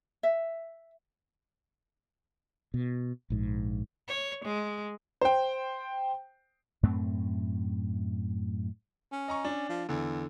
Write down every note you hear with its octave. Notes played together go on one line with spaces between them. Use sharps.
E5
B2
A#1 G#2
C#5
G#3
C5 G5
F#2 A2 A3 C4
C#4
D#5 A#5 C#6
D4
F3
E2 D3